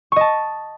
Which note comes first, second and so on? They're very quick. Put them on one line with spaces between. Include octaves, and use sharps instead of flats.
C#6 D#5 A5